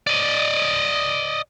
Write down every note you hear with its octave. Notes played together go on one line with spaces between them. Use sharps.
D5 D#5